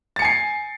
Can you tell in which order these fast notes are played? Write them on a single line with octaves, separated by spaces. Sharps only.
A6 C#7 G#5 C7